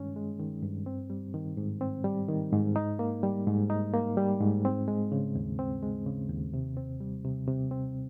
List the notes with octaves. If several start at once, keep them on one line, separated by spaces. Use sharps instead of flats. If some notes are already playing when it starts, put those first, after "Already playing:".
Already playing: G2 D#3 G#3 C#4
G#3
D#3
G2
C4
G3
D#3
G#2
C4
G3
D#3
G#2
D#4
A#3
G3
G#2
D#4
A#3
G3
G#2
C4
G#3
C#3
D#2
C4
G#3
C#3
D#2
C3
C4
G3
C3
C3
C4